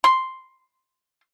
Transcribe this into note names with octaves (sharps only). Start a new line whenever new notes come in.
C6